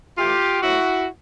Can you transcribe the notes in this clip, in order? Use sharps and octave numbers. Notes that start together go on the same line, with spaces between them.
A2 E3 A3 F4 G4
B2 F#3 A3 E4 F#4